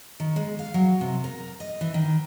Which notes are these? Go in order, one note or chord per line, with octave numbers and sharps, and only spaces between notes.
D#3
G#3
F5
F#3
C3
A#4
D#5
E3
D#3